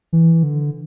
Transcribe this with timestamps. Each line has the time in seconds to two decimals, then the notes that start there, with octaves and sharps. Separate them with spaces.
0.13 E3
0.43 D3